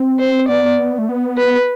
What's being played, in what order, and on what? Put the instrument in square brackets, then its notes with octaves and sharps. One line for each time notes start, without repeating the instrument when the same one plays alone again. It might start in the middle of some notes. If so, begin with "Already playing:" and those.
Already playing: [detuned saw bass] C4
[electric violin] C5
[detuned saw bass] B3 [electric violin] D5
[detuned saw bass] A3
B3
[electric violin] B4